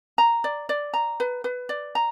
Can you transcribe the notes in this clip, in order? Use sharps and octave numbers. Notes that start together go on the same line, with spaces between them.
A#5
D5
D5
A#5
B4
B4
D5
A#5